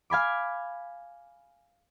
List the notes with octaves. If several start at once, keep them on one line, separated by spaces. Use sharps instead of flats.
F5 G#5 B5 D6